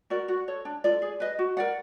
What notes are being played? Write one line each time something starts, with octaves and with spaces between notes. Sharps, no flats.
F#4 A#4 D5
F#4
A4 C#5
D4
F4 A4 D5
G#4
B4 D#5
F#4
A#4 D5 F#5